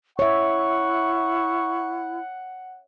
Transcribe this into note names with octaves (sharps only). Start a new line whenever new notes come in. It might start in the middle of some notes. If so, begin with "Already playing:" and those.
E4 C#5 E5 F#5 C#6